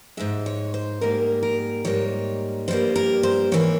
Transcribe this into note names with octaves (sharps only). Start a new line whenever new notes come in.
G#2 F3 G#3 E5
C#5
C5
G#2 G3 A#3 A#4
A#4
G#2 G3 A#3 C#5
G2 G3 A#3 C5
A#4
C5
G#2 E3 A#3 C#5